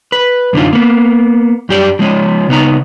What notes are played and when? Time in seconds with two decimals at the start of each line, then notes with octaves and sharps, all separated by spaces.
0.12 B4
0.53 F#2 D3 A#3 D#4 F4
0.73 A#3 B3
1.69 F#2 G4 D5
1.99 F3 G#3 C#4
2.49 C#3 B3 D#4 A#5